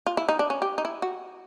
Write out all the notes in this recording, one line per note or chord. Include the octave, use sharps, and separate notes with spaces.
F4
E4
D#4
D4
C#4
G4
D#4
E4
F#4